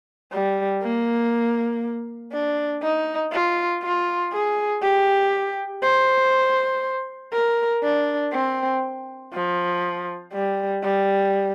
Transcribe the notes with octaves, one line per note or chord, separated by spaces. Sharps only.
G3
A#3
D4
D#4
F4
F4
G#4
G4
C5
A#4
D4
C4
F3
G3
G3